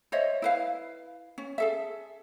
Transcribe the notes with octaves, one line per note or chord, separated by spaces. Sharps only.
C5 C#5 D#5 E5
E4 B4 F5
C#4
G#4 A4 E5